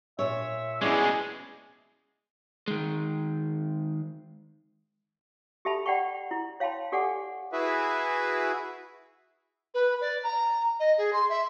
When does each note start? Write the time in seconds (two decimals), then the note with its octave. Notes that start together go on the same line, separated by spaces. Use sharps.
0.19 A#2 C#5 E5
0.81 B2 G#3 C#4 E4 G#4 D5
2.68 D#3 G#3
5.65 G4 A4 E5 A5 B5
5.86 D5 F#5 G5 B5 C#6
6.31 E4
6.60 C#5 F5 G5 A5 B5 C6
6.92 G4 A4 D5 F#5 G#5 D6
7.53 E4 F#4 G#4 B4 E5
9.74 B4
10.01 D5
10.23 A#5
10.79 D#5
10.97 G#4
11.13 C6
11.29 E5